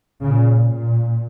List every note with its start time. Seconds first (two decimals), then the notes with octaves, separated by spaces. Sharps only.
0.22 A#2 C#3
0.71 A#2